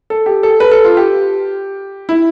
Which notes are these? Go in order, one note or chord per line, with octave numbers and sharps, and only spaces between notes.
A4
G4
A4
B4
A4
F4
G4
E4